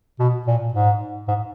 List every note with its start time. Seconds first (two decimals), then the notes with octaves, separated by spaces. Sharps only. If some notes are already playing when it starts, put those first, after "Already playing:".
0.19 B2
0.47 A#2
0.74 G#2
1.28 G#2